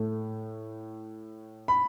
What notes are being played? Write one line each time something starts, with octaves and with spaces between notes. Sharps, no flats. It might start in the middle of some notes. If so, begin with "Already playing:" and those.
Already playing: A2 A3
B5